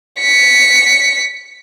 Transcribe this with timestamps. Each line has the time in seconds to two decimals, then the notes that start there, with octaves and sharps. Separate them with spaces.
0.19 B6 C#7